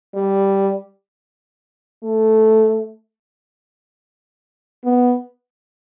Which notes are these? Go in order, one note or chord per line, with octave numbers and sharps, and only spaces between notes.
G3
A3
B3